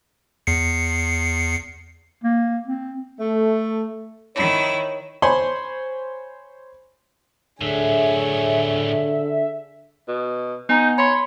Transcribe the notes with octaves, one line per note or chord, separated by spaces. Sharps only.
E2 C7 C#7
A#3
C4
A3
D#3 E4 C#5
C5 C#5 G#5 B5 C6
A2 D3 F#3 G#4 C#5 E5
B2
B3 D#4 G#5 A#5
C#5 B5 C6